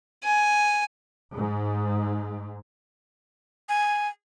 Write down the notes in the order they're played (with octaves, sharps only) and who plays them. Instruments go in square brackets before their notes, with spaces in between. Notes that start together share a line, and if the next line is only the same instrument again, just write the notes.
[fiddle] G#5
[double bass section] G#2
[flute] G#5